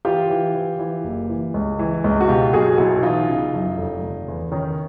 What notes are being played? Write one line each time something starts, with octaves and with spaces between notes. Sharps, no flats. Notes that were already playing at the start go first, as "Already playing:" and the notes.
E3 F4 G4
E3
E3
E3
F#1
E3
C#2
E3
C#2
F#4
B2 F4 G4
B1 F#4 G#4
B1 E4 F#4
E3 D#4 F4
C#3
F#2
F1
F1
E2
D#3 C#4 D#4